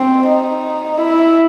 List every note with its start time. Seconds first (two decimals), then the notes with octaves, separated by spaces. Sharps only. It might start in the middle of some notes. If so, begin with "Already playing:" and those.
Already playing: C4
0.27 D#4
0.98 E4